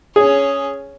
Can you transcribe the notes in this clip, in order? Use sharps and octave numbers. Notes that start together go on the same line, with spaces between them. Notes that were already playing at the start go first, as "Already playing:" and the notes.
C#4 G#4 C#5